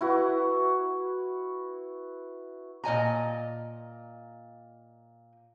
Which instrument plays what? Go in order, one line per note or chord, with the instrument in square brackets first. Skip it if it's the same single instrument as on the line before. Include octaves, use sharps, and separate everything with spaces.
[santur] E4 F#4 B4
[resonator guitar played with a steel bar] A#2 D#5 G#5 A#5